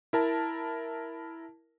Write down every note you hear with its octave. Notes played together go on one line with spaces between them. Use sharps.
E4 A#4 A5